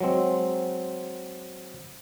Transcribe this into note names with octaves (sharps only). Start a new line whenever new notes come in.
F#3 G#3 C4